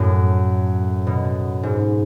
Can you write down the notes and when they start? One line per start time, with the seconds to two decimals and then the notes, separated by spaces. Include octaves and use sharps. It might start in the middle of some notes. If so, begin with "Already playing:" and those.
Already playing: F#2 A2
1.07 B2
1.63 G#2